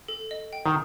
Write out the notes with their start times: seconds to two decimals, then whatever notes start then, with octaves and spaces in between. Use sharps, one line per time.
0.08 A4
0.31 D#5
0.53 G5
0.66 D#3